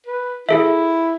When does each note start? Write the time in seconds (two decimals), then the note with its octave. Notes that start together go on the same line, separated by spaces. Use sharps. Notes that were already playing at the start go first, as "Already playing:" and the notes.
0.07 B4
0.49 E4 G#4 A4 E5